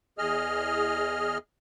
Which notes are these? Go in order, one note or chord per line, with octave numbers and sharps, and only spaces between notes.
E2 G#4 D#5 F6